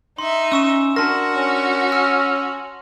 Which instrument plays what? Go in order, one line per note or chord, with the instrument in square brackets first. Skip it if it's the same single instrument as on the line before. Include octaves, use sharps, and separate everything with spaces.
[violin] D#4 E5 [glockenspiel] C6
[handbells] C#4 C#6 [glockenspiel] E6 E7
[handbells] D4 A#4 [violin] F#4 [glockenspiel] A5 C6 A#6
[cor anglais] C#4
[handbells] E6 F6